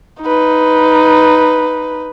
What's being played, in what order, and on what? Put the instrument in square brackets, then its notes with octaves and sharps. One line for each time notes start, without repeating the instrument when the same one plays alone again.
[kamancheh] D#4 B4